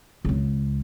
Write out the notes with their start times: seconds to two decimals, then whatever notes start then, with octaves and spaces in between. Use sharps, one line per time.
0.25 C#2 C#3